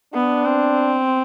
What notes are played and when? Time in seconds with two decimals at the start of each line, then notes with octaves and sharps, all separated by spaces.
0.14 B3 D4
0.46 C4